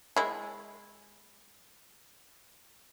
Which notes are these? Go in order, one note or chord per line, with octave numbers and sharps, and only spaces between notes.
G#3 E4